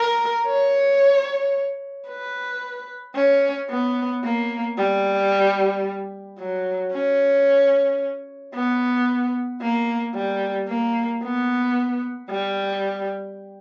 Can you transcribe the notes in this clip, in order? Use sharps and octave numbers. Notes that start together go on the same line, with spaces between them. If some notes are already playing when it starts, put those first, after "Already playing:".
Already playing: A#4
C#5
B4
C#4
B3
A#3
G3
F#3
C#4
B3
A#3
G3
A#3
B3
G3